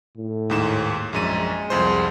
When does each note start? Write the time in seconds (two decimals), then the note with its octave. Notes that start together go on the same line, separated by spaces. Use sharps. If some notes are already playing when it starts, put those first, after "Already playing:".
0.17 A2
0.50 D#2 G#2 E7
1.13 A#1 F#2 G#3 D#7
1.70 C2 F2 C5